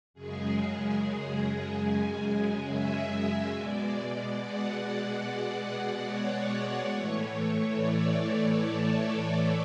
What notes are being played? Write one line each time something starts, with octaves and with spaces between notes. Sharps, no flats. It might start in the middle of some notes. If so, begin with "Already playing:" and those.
F#2 C#3 G#3 G#4
G#4
E5
B2 G#3 D5
F#5
D5
C#5
A2 E3 A3
D5
A4